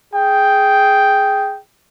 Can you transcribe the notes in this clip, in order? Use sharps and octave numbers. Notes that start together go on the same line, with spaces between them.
G#4 G5